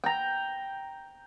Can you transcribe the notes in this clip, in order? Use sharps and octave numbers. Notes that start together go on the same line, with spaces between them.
G5 A#5